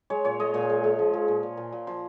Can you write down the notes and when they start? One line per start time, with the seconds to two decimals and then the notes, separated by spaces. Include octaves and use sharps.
0.10 G#3 C#5
0.25 A#2 C#5
0.40 G#3 D#5
0.54 A#2 C#5
0.69 G#3
0.84 G#3
0.99 F3
1.13 F3
1.28 A#2
1.43 A#2
1.57 A#2
1.72 A#2
1.87 F3 C5